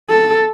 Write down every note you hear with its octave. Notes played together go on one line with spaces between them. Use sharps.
A4